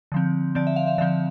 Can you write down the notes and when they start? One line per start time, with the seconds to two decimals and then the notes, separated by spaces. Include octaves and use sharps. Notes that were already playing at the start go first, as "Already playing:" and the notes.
0.12 D3 F3 C4
0.55 D3 F3 C4 D5
0.67 E5
0.76 F5
0.87 E5
0.98 D3 F3 C4 E5